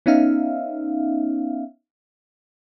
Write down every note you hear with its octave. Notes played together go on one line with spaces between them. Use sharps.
B3 C#4 D#4 E5 F5